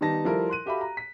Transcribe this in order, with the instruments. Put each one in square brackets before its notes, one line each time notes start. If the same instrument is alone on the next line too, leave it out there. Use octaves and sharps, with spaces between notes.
[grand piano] D#3 G3 B3 D#4 A5 A#6
F3 G3 E4 F4 A4 A#4
C6 F#6 D#7
F#4 G4 A4 E5 F5 B5
A#5
B6